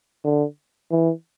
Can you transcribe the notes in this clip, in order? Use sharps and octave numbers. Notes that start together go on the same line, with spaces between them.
D3
E3